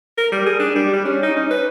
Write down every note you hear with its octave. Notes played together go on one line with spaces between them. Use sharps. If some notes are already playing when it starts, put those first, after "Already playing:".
A#4
G3
G#4
D4
G3
G3
C#4
D#4
C#4
B4